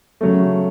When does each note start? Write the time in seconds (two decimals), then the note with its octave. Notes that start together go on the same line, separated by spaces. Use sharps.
0.21 C#3 F#3 A3